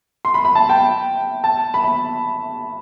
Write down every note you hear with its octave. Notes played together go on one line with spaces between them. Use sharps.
C6
B5
B5
A5
G5
A5
B5
B5